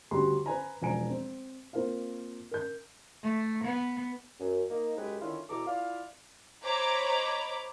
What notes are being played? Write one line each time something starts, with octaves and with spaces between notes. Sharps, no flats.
D2 C#3 G3 F#4 G4 C6
B4 C5 G#5 A#5
E1 F3 G#5 A#5 D7
C4
A#3 C4 F4 A#4 C5 F5
A#4 G6
A3
B3
F#2
A#3 D#4
F#2 G#3 G4 B4
D3 D#3 C#4 E4 F4
E2 B2 E3 A4 A#5 D6
E4 F4 D5 F5
C5 C#5 D#5 A#5 B5 D6